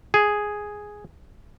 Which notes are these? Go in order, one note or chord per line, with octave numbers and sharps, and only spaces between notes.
G#4